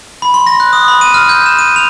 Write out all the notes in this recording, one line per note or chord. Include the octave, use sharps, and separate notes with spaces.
B5
C6
A#6
F#6
D#6
B5
D#7
F6
G6
E7
D#7
F7